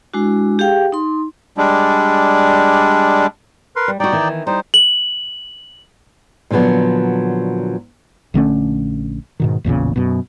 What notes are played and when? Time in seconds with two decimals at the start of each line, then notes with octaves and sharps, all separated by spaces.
0.14 G#3 D4 E4 F#4
0.59 G4 G#4 F5 G5
0.92 D#4 C6
1.58 G3 G#3 D4
3.76 A#4 B4 C6
3.88 G3
4.00 G3 D#4 F#4 D5 G5
4.12 D#3 E3
4.47 G3 D#4 C5
4.74 F#7
6.51 A#2 D3 F3 F#3 B3
8.34 A#1 D3 A3 C#4
9.40 G#2 B2 D#3
9.64 A1 E2 A#2 C#3
9.96 F#2 B2